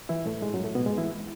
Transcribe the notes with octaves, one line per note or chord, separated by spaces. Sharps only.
E3 E4
A2 A3
G#2 G#3
F#2 F#3
A2 A3
B2 B3
G#2 G#3
E3 E4